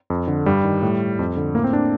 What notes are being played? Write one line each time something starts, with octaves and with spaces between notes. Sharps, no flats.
F2
D3
G2 G3
D#3
A2
F2
D3
A2 A#3
C4
D4